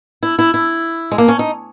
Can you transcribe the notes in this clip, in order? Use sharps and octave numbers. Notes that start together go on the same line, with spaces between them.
E4
E4
E4
G#3
A#3
C#4
D#4